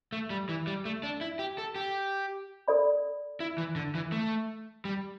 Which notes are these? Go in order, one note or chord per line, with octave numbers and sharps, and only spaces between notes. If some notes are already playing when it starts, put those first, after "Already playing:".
A3
G3
E3
G3
A3
D4
E4
G4
A4
G4
A4 D5 B5
E4
E3
D3
E3
A3
G3